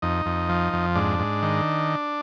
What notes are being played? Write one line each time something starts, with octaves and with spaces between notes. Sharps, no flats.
F2 D#4
F2
F3
F2
G#2 D4
G#2
D#3